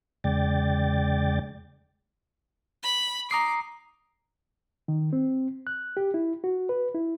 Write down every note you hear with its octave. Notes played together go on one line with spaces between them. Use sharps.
E2 C#3 G#3 D5 G5 A6
B5
A#5 D6 D#6 C7
D#3
C4
F#6
G4
E4
F#4
B4
E4